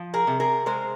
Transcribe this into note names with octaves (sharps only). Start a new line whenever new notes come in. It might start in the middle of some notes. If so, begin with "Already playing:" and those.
Already playing: F3
G#4 A#4
C3
G#4 A#4
G#3 A#4 C5